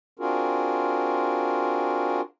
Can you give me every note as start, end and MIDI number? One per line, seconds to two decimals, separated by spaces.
0.19 2.21 60
0.19 2.21 62
0.19 2.21 65
0.19 2.21 66
0.19 2.21 68
0.19 2.21 70